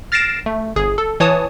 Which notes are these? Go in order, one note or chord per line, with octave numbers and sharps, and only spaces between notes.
F6 A6 A#6 C7 D7 E7
A3
G1 G#4
A4
E3 C#5 A5 D#6